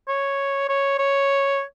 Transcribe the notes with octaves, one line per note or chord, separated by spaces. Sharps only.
C#5
C#5
C#5